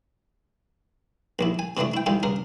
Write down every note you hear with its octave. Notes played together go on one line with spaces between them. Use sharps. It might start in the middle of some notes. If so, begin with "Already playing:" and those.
A#1 D#2 E4
G#5
C3 E3 F3 A3 D4
E4 G5
G#2 D#3 G3 E4 F4
G2 C#3 A#4